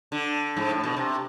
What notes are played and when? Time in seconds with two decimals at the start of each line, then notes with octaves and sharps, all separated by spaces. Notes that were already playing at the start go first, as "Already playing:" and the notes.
0.12 D3
0.57 G#2
0.71 A2
0.84 B2
0.96 C3